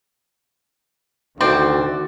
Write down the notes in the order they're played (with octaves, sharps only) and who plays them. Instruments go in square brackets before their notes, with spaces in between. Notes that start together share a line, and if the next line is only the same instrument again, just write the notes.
[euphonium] D2 [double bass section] D#3 [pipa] C4 [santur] F#4 D5